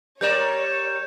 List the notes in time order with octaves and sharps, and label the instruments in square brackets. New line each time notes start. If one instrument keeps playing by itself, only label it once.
[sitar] G3 A#4 D5 [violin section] C#5 [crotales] G6 E7